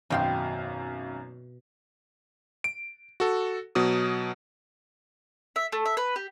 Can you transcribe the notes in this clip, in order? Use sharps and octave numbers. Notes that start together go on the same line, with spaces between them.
G#1 F#2 B2 F5 G5 C6
D7
F#4 A4
B2 F#3 D#6
E5
A3
E5
B4
G4